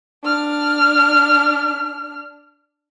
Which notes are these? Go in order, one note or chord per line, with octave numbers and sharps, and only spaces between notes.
D4 F6